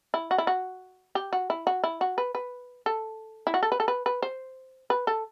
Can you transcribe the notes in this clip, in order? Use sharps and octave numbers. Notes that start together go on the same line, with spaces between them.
E4
F#4
E4
F#4
G4
F#4
E4
F#4
E4
F#4
B4
B4
A4
E4
F#4
A4
B4
A4
B4
B4
C5
B4
A4